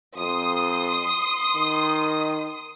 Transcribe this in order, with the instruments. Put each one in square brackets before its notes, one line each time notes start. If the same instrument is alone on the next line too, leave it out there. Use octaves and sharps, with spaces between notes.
[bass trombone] F2 [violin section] C6 D#6
[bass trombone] D#3